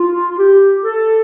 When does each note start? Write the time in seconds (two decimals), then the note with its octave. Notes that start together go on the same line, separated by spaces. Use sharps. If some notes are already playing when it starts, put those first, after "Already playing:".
Already playing: F4
0.31 F4
0.38 G4
0.85 A4